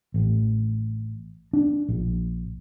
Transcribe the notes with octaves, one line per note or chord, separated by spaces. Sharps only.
A1
D4
A#1